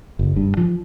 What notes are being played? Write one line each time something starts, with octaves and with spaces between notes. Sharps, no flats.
F#1
G2
F3